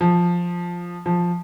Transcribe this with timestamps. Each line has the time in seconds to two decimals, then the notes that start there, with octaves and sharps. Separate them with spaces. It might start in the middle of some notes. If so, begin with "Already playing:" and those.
0.01 F3
1.06 F3